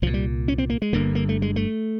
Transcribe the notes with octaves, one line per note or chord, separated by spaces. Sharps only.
C2 A#2 F3
G3
C#4
C4
A#3
G#3
G1 G2 D3 A#3
A#3
A3
G#3
A3